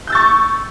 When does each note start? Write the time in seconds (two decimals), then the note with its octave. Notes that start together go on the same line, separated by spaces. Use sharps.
0.07 G6
0.10 E6
0.13 A6
0.15 C#6